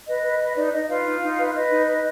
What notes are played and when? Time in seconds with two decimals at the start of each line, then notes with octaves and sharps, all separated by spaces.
0.07 B4 D#5
0.23 B4
0.40 B4
0.56 D#4 D5
0.72 D#4 D#5
0.89 F4 B4 F5
1.06 D#4
1.22 D#4
1.38 B4
1.54 B4 D#5
1.71 D#4
1.87 B4